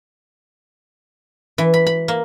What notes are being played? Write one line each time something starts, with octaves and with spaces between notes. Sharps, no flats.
E3
B5
B5
A#3